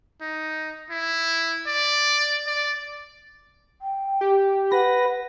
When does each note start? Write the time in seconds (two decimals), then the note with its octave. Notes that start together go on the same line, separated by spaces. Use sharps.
0.21 D#4
0.90 E4
1.67 D5
2.47 D5
3.81 G5
4.21 G4
4.72 B4 F#5 A#6